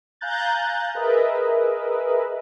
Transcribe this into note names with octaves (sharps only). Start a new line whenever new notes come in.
F5 G#5 A#5 F#6 G6 A6
G#4 A#4 B4 D#5 E5